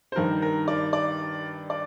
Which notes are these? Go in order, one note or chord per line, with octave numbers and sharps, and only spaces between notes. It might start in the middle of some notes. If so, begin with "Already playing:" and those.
C5
G2 D#3 A#4
A#4
D5
D5
D5